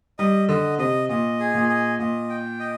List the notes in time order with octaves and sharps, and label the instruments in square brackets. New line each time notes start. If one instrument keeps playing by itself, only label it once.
[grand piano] G3 [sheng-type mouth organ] D#5
[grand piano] D3 [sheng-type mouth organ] D#5
[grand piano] C3 [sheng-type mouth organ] D#5
[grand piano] A#2 [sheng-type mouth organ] D#5
[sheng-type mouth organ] G#4
[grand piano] A#2
[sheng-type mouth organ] D#5
[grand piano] A#2 [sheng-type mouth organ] D#5
[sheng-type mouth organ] G5
D#5